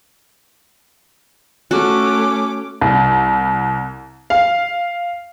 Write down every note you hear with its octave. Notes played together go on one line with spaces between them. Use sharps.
A3 C#4 F#4 D6
C2
F5